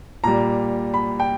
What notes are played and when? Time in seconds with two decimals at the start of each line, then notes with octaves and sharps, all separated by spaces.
0.24 A#2 G3 A#5
0.94 B5
1.20 G5